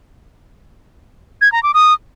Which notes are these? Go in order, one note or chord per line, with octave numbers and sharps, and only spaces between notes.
G#6
A#5
D6
D#6